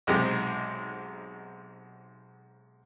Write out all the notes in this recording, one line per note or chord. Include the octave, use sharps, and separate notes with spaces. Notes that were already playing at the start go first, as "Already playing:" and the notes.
B1 G#2 C3 G#3 G4